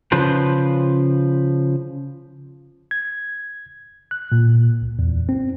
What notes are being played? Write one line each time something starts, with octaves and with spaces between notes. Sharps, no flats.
C#3 F3 B4 C5
G#6
F#6
A#2
C2
E2
C4